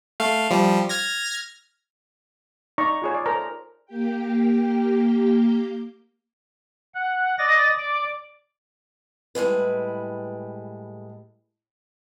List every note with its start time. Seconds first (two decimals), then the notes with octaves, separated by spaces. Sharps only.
0.20 A3 F5
0.50 F3 G3
0.89 F6 G#6 A#6
2.78 D#4 D5 A#5 C#6
3.02 F4 G#4 C#5
3.14 D5
3.26 A4 A#4 C5 A#5
3.86 A#3 G4 G5
6.95 F#5
7.39 D5 D#5 A6 A#6
7.78 D5 D6
9.35 A2 G3 G#3 B4